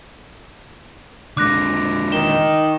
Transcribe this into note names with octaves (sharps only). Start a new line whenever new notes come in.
D3 G#3 D6 F#6 A#6
D#3 E7 G7